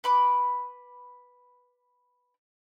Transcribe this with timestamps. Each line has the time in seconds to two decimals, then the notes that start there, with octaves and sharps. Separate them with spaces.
0.04 B4 B5 D6